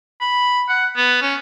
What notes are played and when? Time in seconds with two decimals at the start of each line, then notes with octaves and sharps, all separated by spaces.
0.21 B5
0.69 F#5
0.97 B3
1.22 C#4